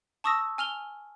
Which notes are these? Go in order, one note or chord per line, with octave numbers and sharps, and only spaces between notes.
A5 C#6 D#6 E6 A#6
G#5 F6 F7 G7